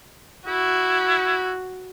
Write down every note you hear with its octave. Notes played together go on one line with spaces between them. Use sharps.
E4 F#4